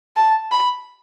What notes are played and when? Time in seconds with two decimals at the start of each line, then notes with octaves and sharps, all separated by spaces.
0.16 A5
0.51 B5